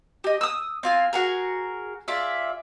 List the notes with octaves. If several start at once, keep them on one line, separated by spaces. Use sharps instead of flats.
G4 D#5
D#6 E6
C4 F4 G#5
F#4 G#4 A#4
F4 G#4 D5 E5